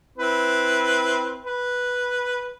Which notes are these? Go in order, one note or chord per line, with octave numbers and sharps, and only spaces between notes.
C4 E4 B4
B4